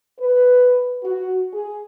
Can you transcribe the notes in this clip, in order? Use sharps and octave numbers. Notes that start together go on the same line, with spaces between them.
B4
F#4
G#4